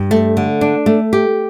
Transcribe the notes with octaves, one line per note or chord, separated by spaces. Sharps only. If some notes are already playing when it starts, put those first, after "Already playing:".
Already playing: G2
A3
D3
D4
A3
G4